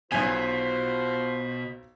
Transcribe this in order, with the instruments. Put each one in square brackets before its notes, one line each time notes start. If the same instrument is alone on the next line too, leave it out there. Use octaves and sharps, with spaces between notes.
[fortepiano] B1 G#5 [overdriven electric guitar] B2 [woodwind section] F4 F#4 C5